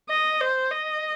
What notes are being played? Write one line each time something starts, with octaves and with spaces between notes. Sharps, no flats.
D#5
C5
D#5